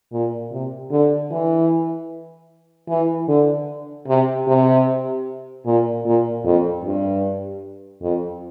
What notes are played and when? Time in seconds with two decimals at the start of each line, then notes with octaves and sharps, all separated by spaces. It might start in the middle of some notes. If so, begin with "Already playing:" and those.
0.12 A#2
0.52 C3
0.91 D3
1.31 E3
2.89 E3
3.28 D3
4.07 C3
4.47 C3
5.66 A#2
6.05 A#2
6.45 F2
6.84 G2
8.02 F2